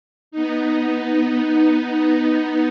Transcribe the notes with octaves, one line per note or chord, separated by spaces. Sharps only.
B3 D#4